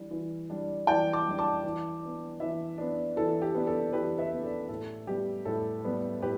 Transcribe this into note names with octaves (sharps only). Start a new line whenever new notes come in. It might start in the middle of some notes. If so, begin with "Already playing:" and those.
Already playing: E3 G3 D4
E3
G3 D4
E3 D5 G5
A5 D6
G3 D4
A5 D6
E3
B3 D4
E3 B4 E5
B3 D4
E3 A4
G4
B3 D4
A4
E3 G4 B4
B4 E5
B3 D4
A4 D5
A2 A4
G3 B3 G4
A2 A4
G3 B3
A2 G4 B4